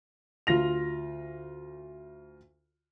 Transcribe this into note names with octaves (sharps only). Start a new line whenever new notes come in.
D2 F4 A#6 F7